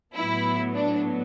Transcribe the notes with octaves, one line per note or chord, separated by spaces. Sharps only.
A2 F#3 B3 E4
D4